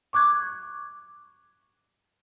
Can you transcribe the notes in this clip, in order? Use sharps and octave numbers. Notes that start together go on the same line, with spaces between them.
C#6 D6 F#6 G#6